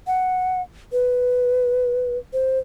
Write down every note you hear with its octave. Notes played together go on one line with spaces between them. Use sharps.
F#5
B4
C5